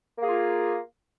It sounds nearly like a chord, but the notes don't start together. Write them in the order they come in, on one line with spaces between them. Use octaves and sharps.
A#3 G#4 F4